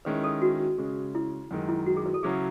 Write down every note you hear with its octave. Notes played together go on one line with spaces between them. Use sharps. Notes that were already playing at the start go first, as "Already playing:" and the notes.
D#3 G#3 C#4 E4 B4
A4
F#4
C#3 G#3 C#4
E4
F#2 D#3 G#3
E4
F#4
G#4
B4
A4
C#3 F#3 C#4 E4 G#4